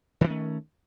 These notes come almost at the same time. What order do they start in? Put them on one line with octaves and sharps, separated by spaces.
D3 D#3 C#4 A3